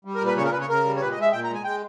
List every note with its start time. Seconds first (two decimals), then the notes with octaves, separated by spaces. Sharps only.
0.05 G3
0.15 A#4
0.21 A#2 B4
0.36 C#3 C#5
0.45 A#4
0.52 C#3 B4
0.61 C#5
0.69 C#3 A#4
0.84 G3
0.96 C#5
1.01 A#2 B4
1.12 D#5
1.17 G#3 E5
1.32 A#2 G5
1.44 A#5
1.49 G#3
1.55 G#5
1.64 G#3 G5